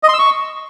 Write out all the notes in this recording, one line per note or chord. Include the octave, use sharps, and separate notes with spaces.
D#5
C6
E6
C#6